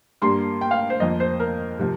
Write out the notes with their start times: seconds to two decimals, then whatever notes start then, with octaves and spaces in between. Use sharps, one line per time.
0.22 G2 G3 A#3 C6
0.61 G5
0.71 F5
0.90 C5
1.00 F2 F3 A#3 D#5
1.20 C5
1.40 A#4
1.79 C3 F3